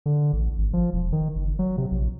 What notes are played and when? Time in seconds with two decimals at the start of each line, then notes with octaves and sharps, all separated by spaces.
0.06 D3
0.33 A1
0.58 G#1
0.73 F3
0.93 E1
1.12 D#3
1.36 F#1
1.59 F#3
1.78 C3
1.91 A#1